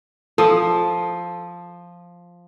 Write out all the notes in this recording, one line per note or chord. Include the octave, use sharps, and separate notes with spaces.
F3 A4 D#6